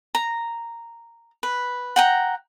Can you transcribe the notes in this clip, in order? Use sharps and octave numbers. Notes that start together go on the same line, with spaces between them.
A#5
B4
F#5 G5 A#5